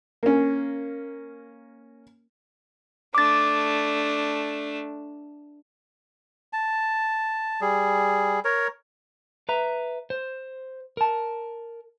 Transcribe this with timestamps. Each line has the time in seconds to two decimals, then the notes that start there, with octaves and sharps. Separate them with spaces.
0.23 A#3 C#4
3.15 A3 D4 D6 A6
6.53 A5
7.61 G3 G#4
8.45 A#4 C#5
9.49 B4 E5 A#5
10.10 C5
10.97 A#4 A5